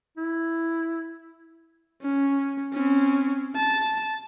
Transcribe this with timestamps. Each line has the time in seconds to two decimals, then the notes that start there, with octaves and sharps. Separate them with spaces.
0.17 E4
2.02 C#4
2.73 C4 C#4
3.55 A5